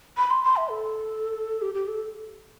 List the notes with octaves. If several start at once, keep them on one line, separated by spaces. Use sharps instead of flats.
B5
C6
C6
E5
A4
G4
G4
A4